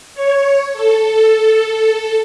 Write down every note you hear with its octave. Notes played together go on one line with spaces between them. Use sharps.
C#5
A4